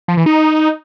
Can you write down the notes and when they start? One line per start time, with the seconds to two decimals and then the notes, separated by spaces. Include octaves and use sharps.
0.08 F3
0.17 E3
0.26 D#4